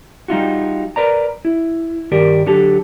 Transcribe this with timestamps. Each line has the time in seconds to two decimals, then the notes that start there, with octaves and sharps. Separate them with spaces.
0.28 G3 D#4 F4 F#4
0.96 A#4 B4 D5 A#5
1.45 E4
2.11 G2 D#3 G4 A#4 D5
2.46 D3 F#3 G4 A4